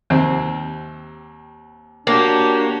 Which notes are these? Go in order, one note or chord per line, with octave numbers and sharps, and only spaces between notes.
D#2 C3 C4
A#3 D4 F#4 G4 C#5